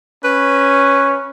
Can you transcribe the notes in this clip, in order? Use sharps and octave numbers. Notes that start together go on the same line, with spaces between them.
C#4 B4